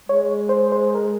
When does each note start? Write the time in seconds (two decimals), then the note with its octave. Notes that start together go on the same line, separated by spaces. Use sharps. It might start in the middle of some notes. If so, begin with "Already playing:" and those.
0.09 G#3 C#5
0.49 C5
0.72 C5
0.95 A#4